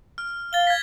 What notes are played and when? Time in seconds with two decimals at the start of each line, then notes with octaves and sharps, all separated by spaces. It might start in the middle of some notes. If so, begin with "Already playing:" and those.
0.18 F6
0.53 F5 A6 G7
0.67 G#6 B6